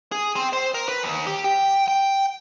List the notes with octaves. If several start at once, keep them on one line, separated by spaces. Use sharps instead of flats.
G#4
C4
C5
A#4
B4
D#2
G4
G5
G5